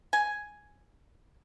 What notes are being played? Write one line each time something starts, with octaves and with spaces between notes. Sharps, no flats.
G#5